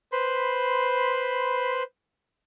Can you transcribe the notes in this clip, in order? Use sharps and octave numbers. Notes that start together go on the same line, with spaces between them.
B4 C5 B5 C6